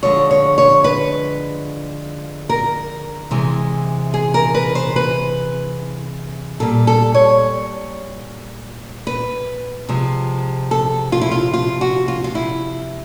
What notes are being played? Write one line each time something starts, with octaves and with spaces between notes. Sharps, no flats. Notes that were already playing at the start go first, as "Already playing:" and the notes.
D3 F3 G#3 C#5
C#5
C#5
B4
A#4
C3 E3 G#3
G#4
A#4
B4
C5
B4
A#2 G3 A4
A4
C#5
B4
C3 F3 G#3
A4
F4
E4
F4
F4
F#4
F4
F4
E4